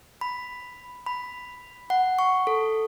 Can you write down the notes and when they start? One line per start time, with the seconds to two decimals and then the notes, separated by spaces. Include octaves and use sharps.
0.21 B5
1.06 B5
1.90 F#5
2.19 C#6
2.47 A4